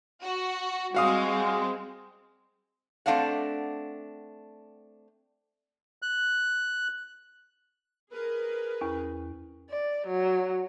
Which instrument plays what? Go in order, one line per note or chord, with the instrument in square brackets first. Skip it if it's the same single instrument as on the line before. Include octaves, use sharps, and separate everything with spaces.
[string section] F#4
[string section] G3 G#3 C4 [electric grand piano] F#4 F5 D#6
[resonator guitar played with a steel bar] A3 C4 D4 F5 F#5
[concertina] F#6
[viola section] G#4 A#4 B4
[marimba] E2 C#4
[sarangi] D5
F#3